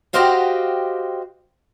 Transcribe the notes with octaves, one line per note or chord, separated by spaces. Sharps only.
F#4 G4 C5 D#5 F5 G5